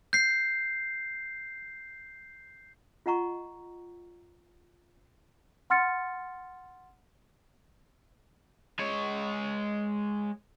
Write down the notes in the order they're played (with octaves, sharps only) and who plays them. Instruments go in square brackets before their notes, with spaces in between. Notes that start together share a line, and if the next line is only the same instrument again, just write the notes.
[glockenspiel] G6 C7
[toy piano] F4 D#5 F#5 A#5 C#6
[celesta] F#5 C6 F6 A6 C#7
[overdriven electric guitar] G#3 C#5